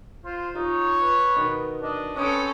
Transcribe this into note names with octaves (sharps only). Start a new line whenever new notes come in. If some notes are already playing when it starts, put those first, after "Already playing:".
F4 C5
D#4 F4 C#5
B4
B2 D#3 B3
D4 D#5
C4 C#4 A4 B4 D#6 C#7 D7